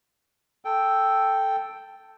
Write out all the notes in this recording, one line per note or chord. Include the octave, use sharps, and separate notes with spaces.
A4 G5